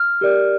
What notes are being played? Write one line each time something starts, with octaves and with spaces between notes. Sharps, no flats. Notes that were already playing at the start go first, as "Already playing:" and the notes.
Already playing: F6
G4 A#4 D5